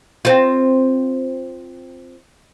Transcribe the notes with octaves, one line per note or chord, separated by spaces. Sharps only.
C4 F4